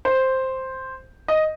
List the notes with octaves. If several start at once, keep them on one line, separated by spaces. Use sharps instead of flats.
C5
D#5